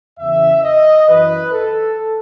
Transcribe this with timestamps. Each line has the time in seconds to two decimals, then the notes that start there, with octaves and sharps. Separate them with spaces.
0.19 E2 C#3 E3 E5
0.63 D#5
1.08 F#2 E3 B4
1.52 A4